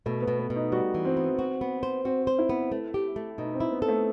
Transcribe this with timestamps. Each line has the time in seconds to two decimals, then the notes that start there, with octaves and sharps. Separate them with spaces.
0.06 B2 A3
0.22 B3
0.28 B2
0.39 B3
0.50 B2
0.56 D#4
0.72 G3 F#4
0.94 E3
1.05 C4
1.17 B3
1.39 F#4
1.61 B3
1.83 C5
2.05 C4 F#4
2.27 C5
2.39 E4
2.49 B3
2.72 A3
2.94 G4
3.16 A3
3.38 B2 D#4
3.54 C4
3.60 E4
3.72 B3
3.82 A4
3.88 A3